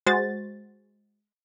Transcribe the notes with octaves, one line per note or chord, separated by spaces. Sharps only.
G#3 F#4 C5 A6